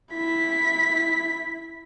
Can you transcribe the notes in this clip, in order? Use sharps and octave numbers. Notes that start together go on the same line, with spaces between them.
E4 B6